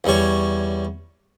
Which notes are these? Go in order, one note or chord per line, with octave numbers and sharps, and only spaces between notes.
E2 G3 C#5